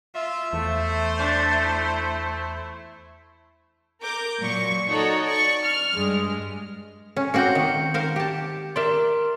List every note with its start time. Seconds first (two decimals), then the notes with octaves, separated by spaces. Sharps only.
0.15 F4 E5
0.53 E2 A3 C5
1.19 D4
1.63 E4
4.01 A#4 D6 G6
4.40 A#2 F#3 C#6
4.88 D#4 F#4 A4 C#5 D5 A#5
5.23 D5 C#6
5.64 F6
5.95 G2 G#3
7.17 C#4
7.34 A#3 C4 F#4 G6 C#7
7.55 D#3
7.94 A#4 C5 F5
8.16 G4 A5
8.76 A#4 D5 E5 C6